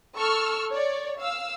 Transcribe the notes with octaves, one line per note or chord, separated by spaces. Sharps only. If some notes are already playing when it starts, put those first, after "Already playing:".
A4 C#6 E6 F6
C#5 D5
F5 E6